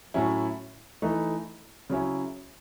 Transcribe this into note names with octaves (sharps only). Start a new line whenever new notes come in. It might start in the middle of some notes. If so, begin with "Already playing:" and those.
A2 F#3 C#4 E4
E3 A3 D#4
C#3 F#3 C#4 E4